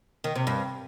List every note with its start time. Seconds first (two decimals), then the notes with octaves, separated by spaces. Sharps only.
0.24 D#3
0.36 C3
0.47 G2